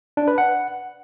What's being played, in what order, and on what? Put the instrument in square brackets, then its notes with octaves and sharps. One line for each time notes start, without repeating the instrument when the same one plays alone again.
[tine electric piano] D4
B4
F#5